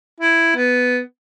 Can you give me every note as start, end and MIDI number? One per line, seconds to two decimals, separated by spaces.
0.20 0.53 64
0.56 1.00 59